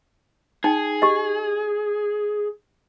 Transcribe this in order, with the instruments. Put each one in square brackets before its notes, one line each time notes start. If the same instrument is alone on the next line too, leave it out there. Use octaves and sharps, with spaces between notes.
[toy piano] D#4 G5 [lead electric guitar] G#4
[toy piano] G4 D#5